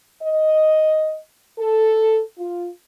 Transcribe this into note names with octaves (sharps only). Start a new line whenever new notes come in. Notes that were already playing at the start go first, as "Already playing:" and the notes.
D#5
A4
F4